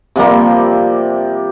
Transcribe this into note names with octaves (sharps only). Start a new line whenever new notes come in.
C3 F3 G3 A#3